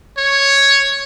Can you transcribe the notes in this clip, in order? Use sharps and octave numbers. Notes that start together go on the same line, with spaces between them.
C#5